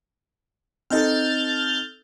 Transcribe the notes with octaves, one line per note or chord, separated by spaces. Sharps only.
C4 D#4 A4 F6 G6 A6